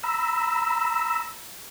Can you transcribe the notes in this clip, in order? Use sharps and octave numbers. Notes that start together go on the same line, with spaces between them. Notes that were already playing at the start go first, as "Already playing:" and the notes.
A#5 B5 E6